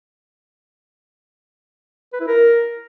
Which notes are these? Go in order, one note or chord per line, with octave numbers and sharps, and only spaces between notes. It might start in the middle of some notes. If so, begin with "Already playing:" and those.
B4
E4
A#4